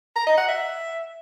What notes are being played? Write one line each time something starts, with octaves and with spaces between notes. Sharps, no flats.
A#5
D#5
F#5
E5